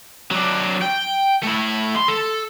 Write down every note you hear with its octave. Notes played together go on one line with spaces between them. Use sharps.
F#3 D4
G5
A3 E4
C6
A4